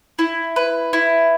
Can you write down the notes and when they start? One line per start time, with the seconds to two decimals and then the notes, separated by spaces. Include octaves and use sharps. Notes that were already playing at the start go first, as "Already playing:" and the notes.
0.19 E4
0.56 B4
0.93 E4